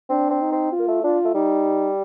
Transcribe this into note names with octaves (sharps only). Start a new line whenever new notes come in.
C4 D4
C4
D#4
C4
F4
A#3
A3
D4 F4
A3
G3 D#4